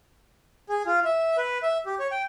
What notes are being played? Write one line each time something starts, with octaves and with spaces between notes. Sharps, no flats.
G#4
F4
E5
B4
E5
G4
C#5
G5